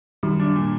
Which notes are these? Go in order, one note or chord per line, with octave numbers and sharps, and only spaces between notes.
F#2 D#3 G3
D4
A#2